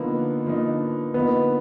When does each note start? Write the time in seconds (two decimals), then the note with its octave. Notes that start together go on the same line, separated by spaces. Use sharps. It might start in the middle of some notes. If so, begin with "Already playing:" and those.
Already playing: D3 F3 A#3 B3 D#4
0.45 D3 F3 A#3 D#4
1.14 D3 F3 A#3 B3 D#4